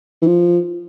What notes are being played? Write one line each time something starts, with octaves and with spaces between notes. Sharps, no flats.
E3
F3